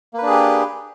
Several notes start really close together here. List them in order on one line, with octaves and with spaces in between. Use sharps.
A#3 B4 D4 G#4 G4